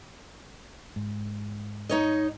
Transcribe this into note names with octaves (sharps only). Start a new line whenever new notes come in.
G#2
D#4 C#5 D#5